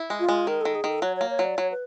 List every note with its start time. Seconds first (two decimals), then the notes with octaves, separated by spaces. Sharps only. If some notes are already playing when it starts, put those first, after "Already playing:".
Already playing: E4
0.10 G#3
0.20 F4
0.29 G#3
0.47 D#3 A#4
0.61 D#3 A4
0.75 G#4
0.84 D#3 A4
1.02 F#3 C#5
1.16 A#3 C#5
1.30 C#5
1.39 F#3
1.44 D5
1.57 F#3 C#5
1.72 B4